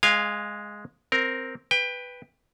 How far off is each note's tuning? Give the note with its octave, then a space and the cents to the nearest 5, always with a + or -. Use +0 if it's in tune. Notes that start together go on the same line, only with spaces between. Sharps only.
G#3 +0 F5 -5 G#5 -30
C4 +0 A#4 +0
B4 +0 G5 +20